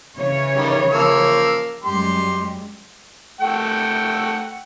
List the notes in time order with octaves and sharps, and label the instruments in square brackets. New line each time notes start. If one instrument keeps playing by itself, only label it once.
[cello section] C#3 E3 C#5
[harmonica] D#3 G3
F3 A#3 E6
[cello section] F#2 G3 G#3 [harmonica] G4 C6
[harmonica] A3 F#5 G5